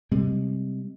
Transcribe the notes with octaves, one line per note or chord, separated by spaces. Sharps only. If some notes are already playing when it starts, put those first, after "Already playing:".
C3 G3 G#3